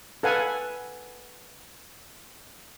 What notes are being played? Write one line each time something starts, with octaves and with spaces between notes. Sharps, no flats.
A4 B4 F5 F#5 G#5